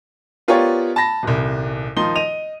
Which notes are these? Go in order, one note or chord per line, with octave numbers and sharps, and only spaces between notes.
B3 F4 G4 A#4 C#5 D5
A5 B5 A#6
D#1 C2
D#3 F3 D#4 C6 G7
D#5 D#7 F7